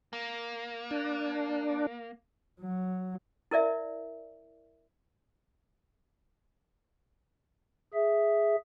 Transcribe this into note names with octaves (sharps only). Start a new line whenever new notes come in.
A#3
D4
F#3
E4 A#4 D5 E5
G#4 E5